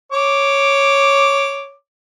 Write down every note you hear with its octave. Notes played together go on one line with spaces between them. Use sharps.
C#5 D6